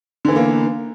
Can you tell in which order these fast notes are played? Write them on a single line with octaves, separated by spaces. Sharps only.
D3 E3 B3 A#3